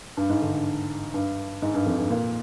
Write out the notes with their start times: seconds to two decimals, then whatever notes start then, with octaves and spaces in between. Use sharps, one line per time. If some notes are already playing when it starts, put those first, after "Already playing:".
0.17 G2
0.29 G#2
0.42 D3
0.53 D3
1.14 G2
1.62 G#2
1.74 G2
1.86 F2
1.98 G2
2.10 A#2